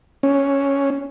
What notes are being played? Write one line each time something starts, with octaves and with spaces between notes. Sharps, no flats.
C#4